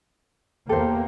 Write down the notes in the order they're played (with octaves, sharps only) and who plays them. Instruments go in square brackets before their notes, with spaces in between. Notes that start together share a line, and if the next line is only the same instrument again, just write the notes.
[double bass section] E2 A#3 [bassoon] G4 [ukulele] A4 C5